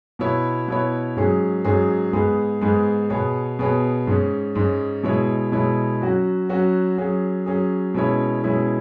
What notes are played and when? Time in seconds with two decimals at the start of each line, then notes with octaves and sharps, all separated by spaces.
0.19 B2 B3 E4 C#5
0.68 B2 B3 E4 C#5
1.17 G#2 F#3 C#4 G#4
1.64 G#2 F#3 C#4 G#4
2.13 G#2 G#3 B3 G#4
2.61 G#2 G#3 B3 G#4
3.10 B2 B3 G#4 C#5
3.59 B2 B3 G#4 C#5
4.07 G#2 G#3 C#4
4.55 G#2 G#3 C#4
5.03 B2 G#3 E4 C#5
5.52 B2 G#3 E4 C#5
6.01 F#3 C#4 F#4
6.49 F#3 C#4 F#4
6.98 F#3 C#4 G#4
7.46 F#3 C#4 G#4
7.94 B2 G#3 C#4 E4 C#5
8.43 B2 G#3 C#4 E4 C#5